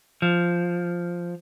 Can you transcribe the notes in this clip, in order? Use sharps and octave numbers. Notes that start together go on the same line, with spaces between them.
F3